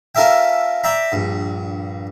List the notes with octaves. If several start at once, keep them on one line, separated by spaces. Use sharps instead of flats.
C#4 F4 A4 A#4 E5 G5
D5 E5 G5 A#5 B5
A#1 G2